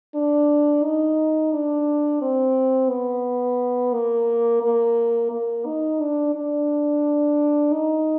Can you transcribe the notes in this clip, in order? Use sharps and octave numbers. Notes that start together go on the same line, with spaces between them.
D4
D#4
D4
C4
B3
A#3
A#3
A#3
D#4
D4
D4
D#4